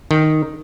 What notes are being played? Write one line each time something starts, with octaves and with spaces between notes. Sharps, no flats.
D#3